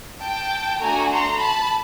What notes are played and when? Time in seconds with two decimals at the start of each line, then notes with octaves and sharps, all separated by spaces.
0.21 G5 A5
0.80 A3 D4 F#4 A4 G#5 A#5
1.10 A#5 C6
1.40 A5 B5